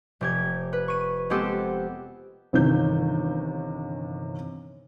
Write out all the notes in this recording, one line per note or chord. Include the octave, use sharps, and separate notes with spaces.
F1 G4 G#6
B4
C#6 D#7
G#3 B3 C4 G4 A4
G1 C3 D#3 E3 G6